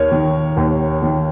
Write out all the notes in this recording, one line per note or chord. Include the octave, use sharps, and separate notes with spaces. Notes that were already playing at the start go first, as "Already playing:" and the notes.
Already playing: D#2 A#4 C#5
D#3
D#2
D#3